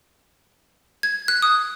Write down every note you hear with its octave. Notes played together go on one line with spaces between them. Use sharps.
G#6
F#6
D#6